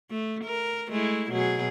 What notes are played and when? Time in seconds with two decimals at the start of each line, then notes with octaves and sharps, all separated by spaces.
0.11 A3
0.45 A#4
0.90 G#3 A3 E4
1.31 B2 F#3 G#4